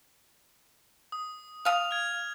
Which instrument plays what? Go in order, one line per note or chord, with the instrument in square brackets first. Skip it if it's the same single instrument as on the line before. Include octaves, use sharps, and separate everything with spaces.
[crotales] D#6
[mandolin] F5 D#6 [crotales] F7
[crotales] F6 G#6